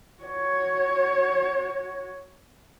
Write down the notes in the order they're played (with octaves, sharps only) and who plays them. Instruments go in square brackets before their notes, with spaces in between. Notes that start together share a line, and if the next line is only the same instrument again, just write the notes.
[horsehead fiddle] F#4 C#5